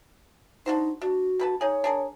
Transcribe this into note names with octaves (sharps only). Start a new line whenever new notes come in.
D4 D#4 F#4 C5
D4 F#4
D3 B4 A5
D#4 G#4 C#5
D4 G#4 A#4